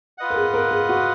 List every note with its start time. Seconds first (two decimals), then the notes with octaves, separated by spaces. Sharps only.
0.18 F4 B4 D#5 F#5
0.30 A#4
0.36 G#4
0.54 A#4
0.71 G#4
0.89 F#4